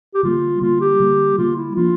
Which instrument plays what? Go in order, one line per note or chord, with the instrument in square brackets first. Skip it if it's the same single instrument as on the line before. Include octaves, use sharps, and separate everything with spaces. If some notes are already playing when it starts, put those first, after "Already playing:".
[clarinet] G4
[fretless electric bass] D3 G3 A#3 [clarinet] F4
[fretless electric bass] D3 G3 A#3 [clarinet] F4
[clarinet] G4
[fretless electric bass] D3 G3 A#3
[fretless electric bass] D3 G3 A#3 [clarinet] F4
[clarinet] E4
[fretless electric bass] F3 A#3 D4 [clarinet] F4